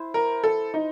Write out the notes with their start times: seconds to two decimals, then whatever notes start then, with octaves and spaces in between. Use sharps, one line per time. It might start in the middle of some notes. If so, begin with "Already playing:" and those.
Already playing: E4 C5
0.14 A#4
0.44 A4
0.74 D#4